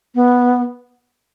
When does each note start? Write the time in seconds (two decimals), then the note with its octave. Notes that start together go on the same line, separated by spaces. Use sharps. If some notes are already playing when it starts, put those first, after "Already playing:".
0.15 B3